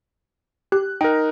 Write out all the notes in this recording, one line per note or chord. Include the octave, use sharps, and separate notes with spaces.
G4 F#6
D#4 A#4 G5